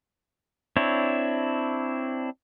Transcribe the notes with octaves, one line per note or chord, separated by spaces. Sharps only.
C4 D4 E4 C#5